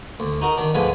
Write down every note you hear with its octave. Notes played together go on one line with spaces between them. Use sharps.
D2
D#4 F#4 A#4
D#3 D4
D2 G#2 D3 F3 B4 G#5